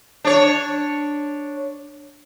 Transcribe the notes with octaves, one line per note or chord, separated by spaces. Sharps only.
D4 C#5